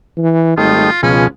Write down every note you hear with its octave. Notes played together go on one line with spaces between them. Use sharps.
E3
G#1 G3 A3 D#4 F4
C#2 B2 F3 G#3 C#4